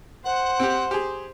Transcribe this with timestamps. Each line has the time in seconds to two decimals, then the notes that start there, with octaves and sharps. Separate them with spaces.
0.24 C5 F#5
0.60 C4 G4
0.91 G4 G#4